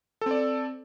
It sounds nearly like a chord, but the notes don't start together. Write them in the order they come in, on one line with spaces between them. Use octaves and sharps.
A4 C4 D5